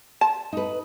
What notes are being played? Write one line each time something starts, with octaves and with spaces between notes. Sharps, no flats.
A5
D#4 B4